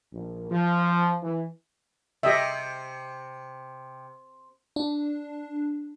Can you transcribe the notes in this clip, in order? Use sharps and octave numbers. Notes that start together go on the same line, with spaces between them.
A#1
F3
E3
C3 G4 D#5 E5
D4